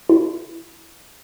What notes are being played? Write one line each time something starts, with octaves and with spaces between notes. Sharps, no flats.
E4